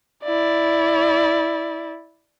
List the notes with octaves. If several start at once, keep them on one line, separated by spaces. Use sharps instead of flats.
E4 D5